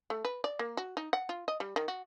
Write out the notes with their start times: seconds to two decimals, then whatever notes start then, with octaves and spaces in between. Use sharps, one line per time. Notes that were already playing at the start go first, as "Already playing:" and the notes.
0.10 A3
0.25 B4
0.44 D5
0.59 A#3
0.77 F#4
0.97 D#4
1.13 F#5
1.29 F4
1.48 D#5
1.60 G3
1.76 D#3
1.88 F#4